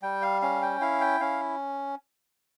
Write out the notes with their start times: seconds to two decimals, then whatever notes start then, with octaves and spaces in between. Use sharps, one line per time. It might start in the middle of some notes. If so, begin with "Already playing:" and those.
0.02 G3 G5
0.22 F5
0.42 C#4 F5
0.62 G5
0.81 E4 F5
1.01 G5
1.20 C#4 F5